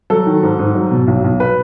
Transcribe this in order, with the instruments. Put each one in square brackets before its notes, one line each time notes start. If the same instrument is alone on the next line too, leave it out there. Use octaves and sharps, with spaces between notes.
[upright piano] F#3 A4
D#3
G#2
G#2
F#3
B2
B1
B1
B4